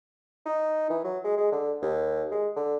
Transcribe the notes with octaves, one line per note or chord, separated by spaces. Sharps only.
D#4
E3
F#3
G#3
G#3
D3
D#2
G#3
D3